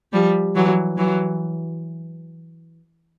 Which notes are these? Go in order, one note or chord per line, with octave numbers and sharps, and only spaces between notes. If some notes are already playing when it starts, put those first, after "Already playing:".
F3 G3
E3 F#3
E3 F#3